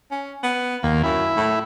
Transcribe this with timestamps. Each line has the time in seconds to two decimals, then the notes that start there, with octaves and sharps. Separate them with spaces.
0.11 C#4
0.43 B3
0.83 D#2 A#3
1.04 F#2 E4
1.36 A2